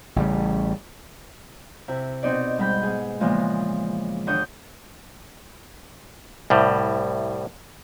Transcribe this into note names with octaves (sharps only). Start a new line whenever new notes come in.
A1 C#3 G3
C3 E4
B2 C4 D#4 D5
G#2 G3 B5 G6
B3 G#4
A#2 C#3 E3 F3 G#3 B3
D#2 D3 D4 C#6 D#6 G6
C2 A2 G3